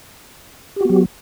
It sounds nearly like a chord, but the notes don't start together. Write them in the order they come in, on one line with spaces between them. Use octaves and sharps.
G4 F#4 B3 F#3